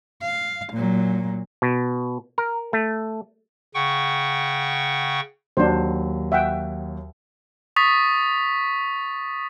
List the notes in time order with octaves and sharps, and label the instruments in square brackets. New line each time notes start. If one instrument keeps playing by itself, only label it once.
[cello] F5
A#2 F#3
[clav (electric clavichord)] B2
A#4
A3
[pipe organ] C#3 F#5 G5 C#6
[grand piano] D#2 F#3 [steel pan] D4 C5
[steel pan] E5 F#5 G5
[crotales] C#6 D#6 A6 B6